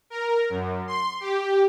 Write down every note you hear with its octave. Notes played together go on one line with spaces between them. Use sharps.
A#4
F#2
C6
G4